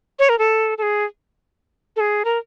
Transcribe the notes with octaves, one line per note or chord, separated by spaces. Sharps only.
C#5
A#4
A4
A4
G#4
A4
G#4
A#4